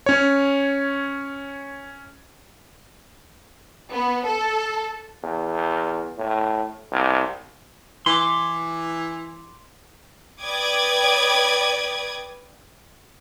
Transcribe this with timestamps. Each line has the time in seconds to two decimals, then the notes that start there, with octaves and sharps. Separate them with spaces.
0.06 C#4 C#5
3.91 B3
4.25 A4
5.23 E2
6.18 A2
6.91 C2
8.06 E3 C6 D6
10.42 B4 D5 G5 D6 D#6 G#6